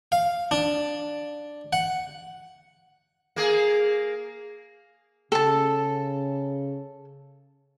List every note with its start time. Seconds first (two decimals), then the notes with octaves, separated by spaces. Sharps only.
0.12 F5
0.51 D4
1.73 F#5
3.36 A#3 G#4
5.32 C#3 A4 A5